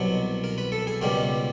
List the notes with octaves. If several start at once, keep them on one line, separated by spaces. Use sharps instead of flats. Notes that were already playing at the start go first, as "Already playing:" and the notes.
Already playing: C2 B2 F#3
A#4
B4
A4
G#4
C#2 B2 G3 A#4